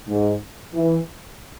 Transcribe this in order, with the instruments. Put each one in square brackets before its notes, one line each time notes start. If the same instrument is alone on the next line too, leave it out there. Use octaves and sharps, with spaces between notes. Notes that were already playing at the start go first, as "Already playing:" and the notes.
[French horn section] G#2
E3